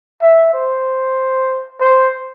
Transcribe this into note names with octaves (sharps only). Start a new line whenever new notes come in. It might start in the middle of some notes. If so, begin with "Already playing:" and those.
E5
C5
C5